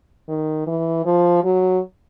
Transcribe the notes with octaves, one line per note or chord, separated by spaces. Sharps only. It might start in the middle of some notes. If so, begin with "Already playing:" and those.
D#3
E3
F3
F#3